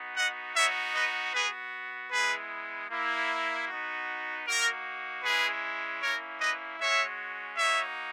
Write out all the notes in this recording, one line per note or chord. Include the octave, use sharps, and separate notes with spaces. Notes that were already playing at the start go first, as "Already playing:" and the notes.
Already playing: B3 D#4 F#4
D#5 F#5
B3 D#4 F#4 C#5 E5
B4 D#5
B3 F#4 G#4 B4
G#3 B3 E4 G#4 B4
A#3 E4
B3 D#4 F#4
A#3 D#4 F#4 A#4
G#3 C#4 E4 G#4 B4
A#3 C#4 E4 A#4 C#5
B4 D#5
G#3 C#4 F#4 C#5 E5
A#3 D#4 F#4 C#5 E5